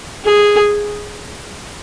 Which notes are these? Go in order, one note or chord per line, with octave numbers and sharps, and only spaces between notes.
G#4